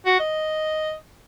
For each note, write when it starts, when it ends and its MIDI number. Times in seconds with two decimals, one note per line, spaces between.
0.06 0.18 66
0.20 0.94 75